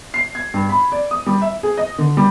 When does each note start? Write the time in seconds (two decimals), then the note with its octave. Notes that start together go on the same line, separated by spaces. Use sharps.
0.14 C7
0.35 G#6
0.54 G2
0.69 B5
0.92 D5
1.11 D#6
1.26 G3
1.42 E5
1.63 G#4
1.78 D#5
1.98 D3
2.17 G3